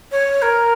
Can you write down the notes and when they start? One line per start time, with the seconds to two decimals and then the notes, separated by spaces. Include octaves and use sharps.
0.11 C#5
0.42 A#4